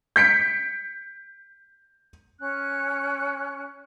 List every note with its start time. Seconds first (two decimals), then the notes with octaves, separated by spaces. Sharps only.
0.16 G6 B6 C#7 D7
2.39 C#4 F#6